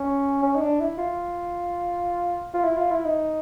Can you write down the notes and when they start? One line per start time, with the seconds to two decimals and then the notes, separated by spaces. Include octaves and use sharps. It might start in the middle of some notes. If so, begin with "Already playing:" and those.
Already playing: C#4
0.43 C#4
0.56 D#4
0.61 D4
0.80 E4
0.98 F4
2.54 F4
2.64 E4
2.77 F4
2.92 E4
3.05 D#4